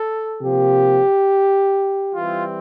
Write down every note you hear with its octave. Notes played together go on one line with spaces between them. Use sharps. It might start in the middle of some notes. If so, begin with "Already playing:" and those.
Already playing: A4
C3 F3 A#3 G4
E3 G3 C4 F4